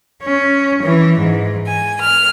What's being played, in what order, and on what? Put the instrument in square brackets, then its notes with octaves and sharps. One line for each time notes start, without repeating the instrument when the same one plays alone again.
[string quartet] C#4
E3
G#2
G#5
F6